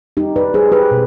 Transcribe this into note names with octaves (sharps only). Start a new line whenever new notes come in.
G3 D#4 G4
B4 D5
G3 G#4 C5
G4 B4
B2